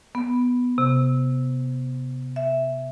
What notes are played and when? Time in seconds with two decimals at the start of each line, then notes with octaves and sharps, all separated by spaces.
0.15 B3
0.78 C3
2.36 E5